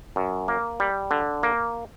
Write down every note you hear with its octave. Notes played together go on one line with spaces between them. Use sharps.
F#2
A#3
G3
D3
A#3